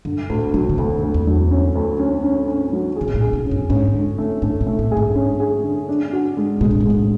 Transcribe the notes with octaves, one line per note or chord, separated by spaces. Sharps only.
F#2 D3
D2 A2
B2 F#3
D3
D2 C#3
D2
E2
F#3
C#4
D2
C#4
C#4
C#4
F#3
C#3 G#4
B2
A2
G#4
B2
C#4
F#2
G#2 C#4
D3
A3
G#2 A3
B2
A3
A2
G#4
G#2
C#4
G#4
D3
D4
F#4
G#3
B2 G#3
A2
G#2
G#3
A2